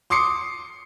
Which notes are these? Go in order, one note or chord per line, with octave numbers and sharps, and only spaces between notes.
C6 D6 D#6 C7 C#7